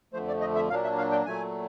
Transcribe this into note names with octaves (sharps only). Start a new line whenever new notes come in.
F2 D3 F3 A3 C5
D5
D#5
E5
A#2 F#3 A#3 D4 F5
E5
F5
G5
A#2 F#3 A3 G#5